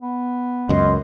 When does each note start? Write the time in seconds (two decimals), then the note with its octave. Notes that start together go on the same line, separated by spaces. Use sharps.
0.01 B3
0.69 C#2 F#2 D#5 C6